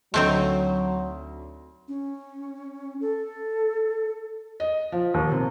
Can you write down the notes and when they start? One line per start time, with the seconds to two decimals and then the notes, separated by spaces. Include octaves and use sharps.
0.14 D2 F#3 A3 C4 D#4 C6
1.88 C#4
3.01 A4
4.60 D#5
4.92 F3
5.14 D#2
5.32 C3